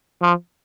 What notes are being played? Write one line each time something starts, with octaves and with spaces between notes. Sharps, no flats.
F3